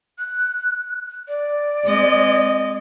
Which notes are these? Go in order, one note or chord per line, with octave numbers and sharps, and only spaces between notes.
F#6
D5
G#3 C4 D#5